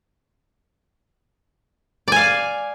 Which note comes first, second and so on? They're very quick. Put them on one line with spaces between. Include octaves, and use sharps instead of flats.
D5 G#5 F5